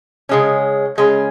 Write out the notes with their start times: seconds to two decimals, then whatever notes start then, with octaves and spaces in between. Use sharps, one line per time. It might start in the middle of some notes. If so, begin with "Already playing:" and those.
0.29 C#3 G#3 C#4
0.98 C#3 G#3 C#4